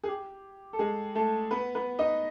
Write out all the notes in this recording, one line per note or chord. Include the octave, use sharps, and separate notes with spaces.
G#4
G4
A4
G#3 G#4
A3 A4
B3 B4
B3 B4
D#4 D#5